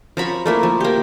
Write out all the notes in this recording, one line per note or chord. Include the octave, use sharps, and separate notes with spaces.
F3 A#5 B5 C#6
A3 A#3 E4
F3
A#3 G4